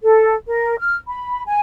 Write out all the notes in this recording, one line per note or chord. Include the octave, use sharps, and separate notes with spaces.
A4
A#4
F6
B5
G#5